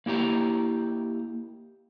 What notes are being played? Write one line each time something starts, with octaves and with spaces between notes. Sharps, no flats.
A#3 E4 G4 A#5